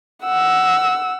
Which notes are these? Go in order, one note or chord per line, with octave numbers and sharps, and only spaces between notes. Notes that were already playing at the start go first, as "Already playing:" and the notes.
F#5 E6